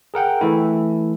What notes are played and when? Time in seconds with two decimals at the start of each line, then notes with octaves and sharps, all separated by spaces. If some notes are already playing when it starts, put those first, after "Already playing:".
0.14 G#4 A#4 F#5 G5
0.41 E3 A3 E4